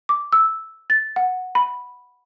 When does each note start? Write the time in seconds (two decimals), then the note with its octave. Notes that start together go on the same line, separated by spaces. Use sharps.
0.09 D6
0.32 E6
0.90 A6
1.16 F#5
1.55 B5